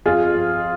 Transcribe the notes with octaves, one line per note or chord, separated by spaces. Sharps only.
F2 F4 G#4
F2